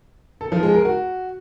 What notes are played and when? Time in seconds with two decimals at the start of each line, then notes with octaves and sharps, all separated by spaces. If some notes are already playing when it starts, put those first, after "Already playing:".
0.41 A4
0.52 F3
0.63 G#3
0.74 A#4
0.85 F#4